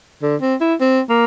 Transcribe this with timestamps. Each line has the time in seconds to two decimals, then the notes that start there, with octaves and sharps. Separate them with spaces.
0.22 D3
0.42 C4
0.61 E4
0.81 C4
1.09 A#3